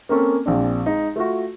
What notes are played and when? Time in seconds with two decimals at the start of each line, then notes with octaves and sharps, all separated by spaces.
0.09 A#3 C4 C#4 A4
0.46 A#1 C4 D4
0.86 G#3 D#4
1.16 A3 F4 F#4